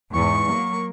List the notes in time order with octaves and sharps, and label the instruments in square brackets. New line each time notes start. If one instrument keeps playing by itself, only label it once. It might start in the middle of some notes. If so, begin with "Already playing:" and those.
[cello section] E2 G#2 [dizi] C#6
[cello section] F#3 A#3